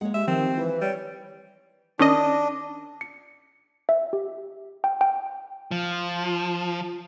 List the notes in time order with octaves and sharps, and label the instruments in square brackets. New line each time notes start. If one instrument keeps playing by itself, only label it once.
[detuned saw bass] G#3 [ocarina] A#3 [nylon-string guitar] C#5 F#5
[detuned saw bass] G#3 [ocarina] G4 [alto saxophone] E5
[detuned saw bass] D#3 [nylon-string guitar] F3 [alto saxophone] C4
[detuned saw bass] E3 [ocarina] B4
[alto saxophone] G3 [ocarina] C#5
[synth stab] D#3 C#4 D#5 [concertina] D4
[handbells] C#7
E5
G4
G5
G5
[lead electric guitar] F3